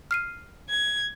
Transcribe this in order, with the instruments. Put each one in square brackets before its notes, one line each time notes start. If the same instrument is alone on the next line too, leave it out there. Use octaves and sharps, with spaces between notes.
[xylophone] F6 C7 D#7
[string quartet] G#6